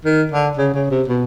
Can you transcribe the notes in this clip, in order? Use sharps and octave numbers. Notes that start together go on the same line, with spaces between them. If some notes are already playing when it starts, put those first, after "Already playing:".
D#3
D3
C#3
C#3
C3
B2